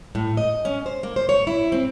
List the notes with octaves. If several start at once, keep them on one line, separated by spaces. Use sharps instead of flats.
A2
D#5
C#4
C5
A#3
C5
C#5
E4
C4